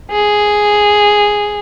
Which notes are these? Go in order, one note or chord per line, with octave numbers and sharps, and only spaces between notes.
G#4